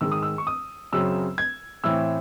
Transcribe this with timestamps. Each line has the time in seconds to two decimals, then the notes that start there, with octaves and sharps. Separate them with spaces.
0.01 G#2 D#3 G#3 E6
0.11 D#6
0.23 E6
0.38 C#6
0.47 D#6
0.92 F#2 C#3 F#3 C4 E6
1.38 G#6
1.84 A2 E3 C4 E6